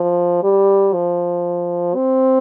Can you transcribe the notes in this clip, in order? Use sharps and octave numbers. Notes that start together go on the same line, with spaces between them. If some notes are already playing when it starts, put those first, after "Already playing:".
Already playing: F3
G3
F3
C4